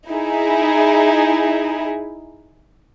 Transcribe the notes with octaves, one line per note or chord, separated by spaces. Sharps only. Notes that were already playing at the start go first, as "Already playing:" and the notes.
D#4 E4 G#4